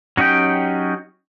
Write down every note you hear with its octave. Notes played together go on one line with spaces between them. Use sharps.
F#3 C#4 D#4 G4 G5